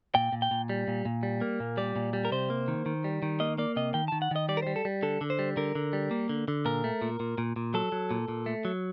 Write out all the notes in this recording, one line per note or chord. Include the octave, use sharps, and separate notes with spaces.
A#2 G5
A#2
G5
A#2
G3
A#2
A#2
G3
A#3
A#2
G3 D5
A#2
G3
A#4
C3 C5
A#3
D#3
D#3
G3
D#3
A#3 D#5
A#3 D5
C3 D#5
D#3 G5
D#3 A5
F#5
D#3 D#5
G3 D5
A#4
G3 C5
A4
G3
D3 A4
D3
C5
G3
D3 A#4
D3
G3
A#3
D3
D3
A#2 A#4
A3
A#2
A#2
A#2
A#2
F#3 A4
F#3
A#2
A#2
A3
F#3